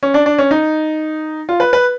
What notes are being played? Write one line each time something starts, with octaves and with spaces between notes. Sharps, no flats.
C#4
D4
D4
C#4
D#4
F4
B4
B4